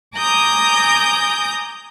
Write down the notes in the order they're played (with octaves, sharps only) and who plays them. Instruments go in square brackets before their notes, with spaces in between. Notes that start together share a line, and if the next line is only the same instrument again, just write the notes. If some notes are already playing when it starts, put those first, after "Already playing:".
[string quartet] G#5 A#5 D6 D#6 G6 A#6